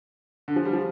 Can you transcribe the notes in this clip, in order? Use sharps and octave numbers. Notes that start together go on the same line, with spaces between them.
D3
F3
G3
F3